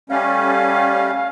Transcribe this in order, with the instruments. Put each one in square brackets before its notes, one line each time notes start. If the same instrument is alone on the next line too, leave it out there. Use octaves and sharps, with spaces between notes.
[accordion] G3 A3 C#4 [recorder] F5